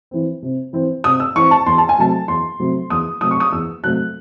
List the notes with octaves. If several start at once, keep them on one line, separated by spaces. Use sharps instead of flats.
E3 C4
C3
E3 C4
C3 D#6
E6
E3 C4 C#6
A5
E2 C6
A5
G#5
C3 F#3 A3 A5
E2 C6
C3 F#3 A3
E2 D#6
C3 F#3 A3 D#6
C#6
D#6
E2 E6
C3 F#3 A3 F#6